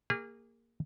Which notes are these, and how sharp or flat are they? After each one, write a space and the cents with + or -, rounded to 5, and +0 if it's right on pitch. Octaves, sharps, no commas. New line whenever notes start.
A#3 -10 G#4 -35